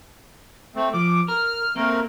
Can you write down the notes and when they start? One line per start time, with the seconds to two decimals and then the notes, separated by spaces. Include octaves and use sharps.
0.76 A3 C4
0.94 F3 D6
1.28 A#4 F6
1.76 A3 A#3 C4 A#4